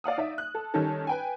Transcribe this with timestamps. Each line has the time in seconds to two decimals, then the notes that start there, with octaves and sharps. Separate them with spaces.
0.04 D5 F5 F#5 D#6
0.18 D#4 D5 E5
0.38 F#6
0.55 A4
0.74 D#3 G3 C#4 D#4 A4
1.07 B4 G5 G#5